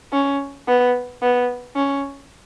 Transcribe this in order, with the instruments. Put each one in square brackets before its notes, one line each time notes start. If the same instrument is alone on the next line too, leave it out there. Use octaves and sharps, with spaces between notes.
[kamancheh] C#4
B3
B3
C#4